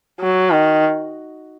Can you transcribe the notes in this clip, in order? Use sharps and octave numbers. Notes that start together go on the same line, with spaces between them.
F#3
D#3